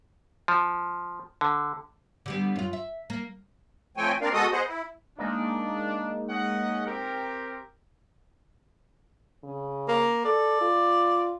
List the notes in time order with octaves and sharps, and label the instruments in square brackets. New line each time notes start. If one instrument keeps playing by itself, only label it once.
[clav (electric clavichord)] F3
D3
[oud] D3 G3 B3
F#2 F4
E5
A#3
[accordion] F3 A3 C4 C#5 G5 G#5
A#3 C4 D4 A#4 D5 F5
B2 G#3 F#4 A4 D#5 D#6
B3 G#4 C5 D#5 F#5
E4
[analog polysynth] G#3 A#3 D#4 [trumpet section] D4
[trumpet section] C#4 D#5 F#5
C4 G4 A#4
[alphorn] C#3
[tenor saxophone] A#3
[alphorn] A4 [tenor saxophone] D5
[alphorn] F4